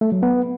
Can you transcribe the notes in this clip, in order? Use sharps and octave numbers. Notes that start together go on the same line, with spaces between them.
A3
F#3
B3